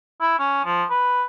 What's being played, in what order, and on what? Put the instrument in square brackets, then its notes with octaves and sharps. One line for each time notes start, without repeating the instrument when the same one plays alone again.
[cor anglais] E4
C#4
F3
B4